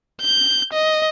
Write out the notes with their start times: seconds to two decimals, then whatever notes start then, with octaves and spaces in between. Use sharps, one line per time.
0.21 G6
0.73 D#5